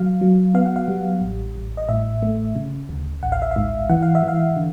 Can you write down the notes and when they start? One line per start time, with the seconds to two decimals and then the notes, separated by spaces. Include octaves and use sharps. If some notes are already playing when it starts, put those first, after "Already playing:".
Already playing: F#3 F5
0.21 F#3
0.54 B3 F5
0.65 F#5
0.76 F5
0.88 G3
1.22 A1
1.55 A1
1.77 D#5
1.89 A2 E5
2.22 A3
2.55 C#3
2.89 D2
3.22 A1 F#5
3.32 F5
3.42 E5
3.51 F5
3.56 G#2
3.90 E3 F#5
4.02 F5
4.15 E5
4.23 E3
4.28 F5
4.56 D3